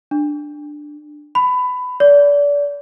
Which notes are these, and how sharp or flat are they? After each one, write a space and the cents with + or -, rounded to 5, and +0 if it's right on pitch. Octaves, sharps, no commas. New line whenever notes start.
D4 +10
B5 +20
D5 -30